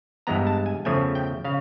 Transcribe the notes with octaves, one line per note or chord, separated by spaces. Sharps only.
G2 E3 G#3 B3 A#5
A5
G#5
E2 C#3 F3 A3 G#5
G5
C#3 F5